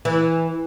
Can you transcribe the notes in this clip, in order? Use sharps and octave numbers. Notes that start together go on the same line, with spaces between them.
E3